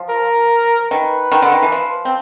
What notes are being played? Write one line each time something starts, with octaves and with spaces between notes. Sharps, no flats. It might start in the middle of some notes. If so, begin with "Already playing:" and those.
Already playing: F3
A#4
D#3 B4
D#3
D3
D#3
E3
F3
C4